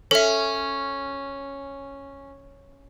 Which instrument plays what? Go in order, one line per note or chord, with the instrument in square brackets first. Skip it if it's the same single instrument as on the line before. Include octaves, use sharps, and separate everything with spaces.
[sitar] C#4 [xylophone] A4 E5